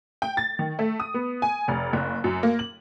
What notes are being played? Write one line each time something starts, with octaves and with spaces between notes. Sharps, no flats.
G5
A6
D#3
A3
D#6
B3
G#5
F1
F#1
F#2
A#3
F#7